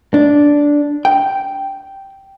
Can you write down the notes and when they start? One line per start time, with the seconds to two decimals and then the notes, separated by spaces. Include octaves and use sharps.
0.14 D4
1.05 G5